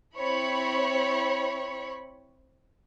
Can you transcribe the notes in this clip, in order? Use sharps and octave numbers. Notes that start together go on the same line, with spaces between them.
C4 E4 C#5 B5 C#6